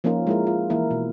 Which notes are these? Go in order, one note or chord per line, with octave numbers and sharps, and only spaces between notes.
F3 A#3 C#4 D#4 F4 A#4
G#3 E4 A#4
F4
E3 A#3 E4 A#4
B2